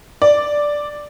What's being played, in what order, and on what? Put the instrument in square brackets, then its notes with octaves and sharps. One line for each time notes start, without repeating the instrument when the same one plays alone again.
[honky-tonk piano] D5